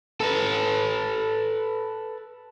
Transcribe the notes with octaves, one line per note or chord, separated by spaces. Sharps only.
A4 B4